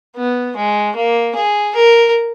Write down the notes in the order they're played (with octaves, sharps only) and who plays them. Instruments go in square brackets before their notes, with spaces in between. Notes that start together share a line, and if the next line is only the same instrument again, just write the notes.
[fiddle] B3
G#3
A#3
G#4
A#4